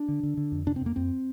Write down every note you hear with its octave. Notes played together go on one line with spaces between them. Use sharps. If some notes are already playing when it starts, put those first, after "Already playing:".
Already playing: D4
D3
D3
D3
F2
C3 D4
C4
F2 A#3
F2 C4